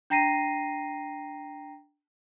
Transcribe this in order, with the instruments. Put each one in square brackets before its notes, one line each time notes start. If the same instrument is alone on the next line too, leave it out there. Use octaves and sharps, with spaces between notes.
[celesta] D4 G5 A#5 A#6 C7 D#7